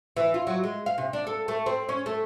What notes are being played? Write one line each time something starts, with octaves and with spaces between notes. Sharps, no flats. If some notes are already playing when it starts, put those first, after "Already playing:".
E3
F4
F#3
G#3
F5
C3
D4
A4
A3
C4
C#4
A3